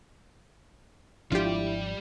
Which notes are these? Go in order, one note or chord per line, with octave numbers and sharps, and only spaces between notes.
G#1 F3 G3 D4 E4 F4 G4 D5